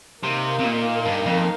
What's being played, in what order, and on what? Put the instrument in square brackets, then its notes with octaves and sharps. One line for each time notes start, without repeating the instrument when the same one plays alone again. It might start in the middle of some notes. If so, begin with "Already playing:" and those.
[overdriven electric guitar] C3 [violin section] A#3 D#4 A#4 F5
[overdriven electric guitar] C3
A#2
G2
F2